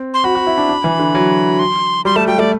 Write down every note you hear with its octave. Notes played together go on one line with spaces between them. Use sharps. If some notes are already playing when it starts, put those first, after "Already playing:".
Already playing: C4
C6
F#4 B5
F#4
E4
D4
D4
E3
D3
F#3
C6
G3 C6
A3 A5
G3 G5
A3 D5